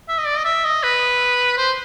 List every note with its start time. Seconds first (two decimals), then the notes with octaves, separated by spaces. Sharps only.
0.08 E5
0.18 D#5
0.26 D5
0.37 D#5
0.45 E5
0.65 D#5
0.83 B4
1.57 C5